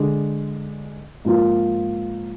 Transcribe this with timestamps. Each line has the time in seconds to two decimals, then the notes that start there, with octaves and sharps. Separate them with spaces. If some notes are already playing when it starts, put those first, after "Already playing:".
Already playing: D3 G#3 D4
1.25 G#2 F3 A#3 F4